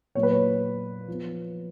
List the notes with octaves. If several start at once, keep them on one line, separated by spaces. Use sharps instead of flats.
A#2 F#3 B3 C#5
B4
C#5
F3 B3